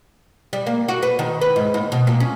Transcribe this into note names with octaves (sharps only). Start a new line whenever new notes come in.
G3
A#3
F#4
B4
D#3
B4
G#2
D#2
B2
A#2
C#4